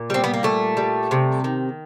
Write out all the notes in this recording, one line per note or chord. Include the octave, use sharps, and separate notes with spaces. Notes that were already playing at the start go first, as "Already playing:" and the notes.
Already playing: A#2
G3 C4
B3
A#3
A#2 A3
G3
C3
D#3